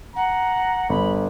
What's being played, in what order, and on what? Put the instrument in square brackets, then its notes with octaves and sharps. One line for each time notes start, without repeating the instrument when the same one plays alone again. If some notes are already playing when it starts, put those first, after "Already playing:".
[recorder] F#5 [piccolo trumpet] A#5
[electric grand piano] G1 [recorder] B5